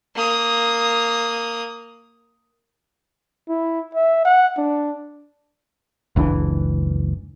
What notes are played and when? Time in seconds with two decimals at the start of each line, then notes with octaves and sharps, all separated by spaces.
0.15 A#3 D#6
3.49 E4
3.95 E5
4.25 F#5
4.57 D4
6.16 F#1 C#2 E3 D4